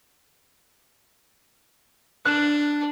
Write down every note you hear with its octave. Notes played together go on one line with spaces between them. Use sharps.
D4 F#6 E7